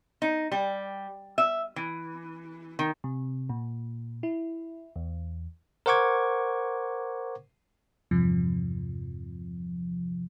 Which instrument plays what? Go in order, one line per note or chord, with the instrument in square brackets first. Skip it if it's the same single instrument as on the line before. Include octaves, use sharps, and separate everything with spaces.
[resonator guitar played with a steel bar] D#4
G3
E5
E3
D#3
[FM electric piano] C3
A#2
E4
E2
[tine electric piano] A#4 C5 F#5 C#6 D6 G#6
[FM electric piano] E2 G2 C3 F3